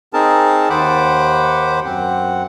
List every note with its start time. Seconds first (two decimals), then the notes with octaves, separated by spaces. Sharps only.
0.13 C4 D#4 G#4 A#4 A5
0.70 D#2 D#3 C5 F#5 B5 D6
1.85 F#2 C4 F#5